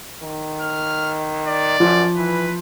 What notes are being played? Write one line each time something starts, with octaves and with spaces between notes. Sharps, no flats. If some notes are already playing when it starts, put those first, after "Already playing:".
D#3
F6
D5
F#2 F3
E3 B4